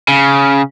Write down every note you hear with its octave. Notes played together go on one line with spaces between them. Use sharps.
C#3